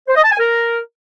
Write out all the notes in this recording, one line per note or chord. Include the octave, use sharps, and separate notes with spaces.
C5
D#5
A5
G#5
A#4